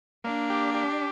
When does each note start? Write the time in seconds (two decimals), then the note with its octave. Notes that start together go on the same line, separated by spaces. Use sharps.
0.24 A#3 D4
0.50 G4
0.74 G4